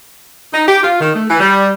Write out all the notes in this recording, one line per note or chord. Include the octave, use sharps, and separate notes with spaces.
D#4
G4
F4
D#3
A3
E3
G3